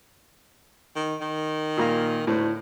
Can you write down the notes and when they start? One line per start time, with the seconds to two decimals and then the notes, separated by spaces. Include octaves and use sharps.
0.96 D#3
1.21 D#3
1.77 A#2 A#3 A#5
2.27 D2 A2